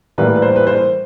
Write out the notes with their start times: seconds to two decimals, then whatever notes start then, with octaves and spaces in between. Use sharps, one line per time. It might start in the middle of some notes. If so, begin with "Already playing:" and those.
0.18 A2 E3 G3 A#3 B4
0.36 B4
0.42 C5
0.56 B4
0.67 C5